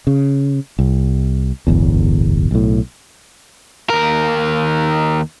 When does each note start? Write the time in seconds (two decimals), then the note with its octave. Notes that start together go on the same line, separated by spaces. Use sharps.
0.07 C#3
0.79 C2
1.67 D1 G1 E2
2.51 B1 A2
3.90 D#2 A#4